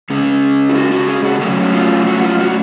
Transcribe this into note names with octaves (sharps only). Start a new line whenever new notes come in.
C#3 G#3 C#4 G#4
F4
F#4
F#4
G#4
F#4
F#3 A3 C#4 F#4
F#4
F4
F#4
F4
F#4